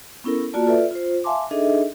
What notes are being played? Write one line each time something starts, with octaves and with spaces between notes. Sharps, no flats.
B3 C#4 E4 A4 A#4
A#3 F4 F#4 D5 A5
F4 A4 B4 D5 E5
F4 C5
E5 F5 G#5 A5 C6 D6
D4 D#4 G#4 A4 D#5 E5